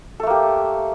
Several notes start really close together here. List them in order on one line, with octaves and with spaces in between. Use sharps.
A4 A3 A#3 G4